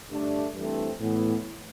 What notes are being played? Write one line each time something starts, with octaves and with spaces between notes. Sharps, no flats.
G2 D3 A3 D4
G2 E3 A3 C4
A2 E3 B3